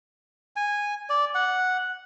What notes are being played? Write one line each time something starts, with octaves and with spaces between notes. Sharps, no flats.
G#5
D5
F#5